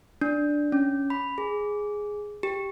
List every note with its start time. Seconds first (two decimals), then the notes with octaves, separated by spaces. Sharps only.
0.21 D4
0.72 C#4
1.10 B5
1.38 G#4
2.43 G4